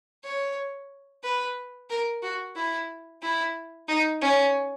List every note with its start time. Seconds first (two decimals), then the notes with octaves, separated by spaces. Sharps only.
0.24 C#5
1.24 B4
1.90 A#4
2.23 F#4
2.56 E4
3.22 E4
3.89 D#4
4.22 C#4